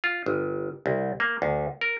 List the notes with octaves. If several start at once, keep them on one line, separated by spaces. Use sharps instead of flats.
F4
G1
C2
A#3
D2
A#4